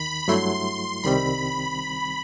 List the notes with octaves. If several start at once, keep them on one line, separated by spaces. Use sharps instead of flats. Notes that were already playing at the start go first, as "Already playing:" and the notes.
Already playing: D#2 D#3 B5
G2 F#3 A3 E4 C6
C2 C3 D#3 G3 C4 B5